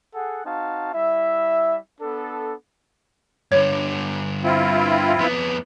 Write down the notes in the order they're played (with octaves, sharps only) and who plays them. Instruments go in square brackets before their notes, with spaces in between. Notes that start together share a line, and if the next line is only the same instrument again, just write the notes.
[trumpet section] G#4 A4 F#5
C4 D#4 F#4 F5 A5
G3 E4 E5
B3 D4 A4
[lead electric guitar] G2 D3 [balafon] C#5
[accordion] C4 E4 F4
[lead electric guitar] F2 B3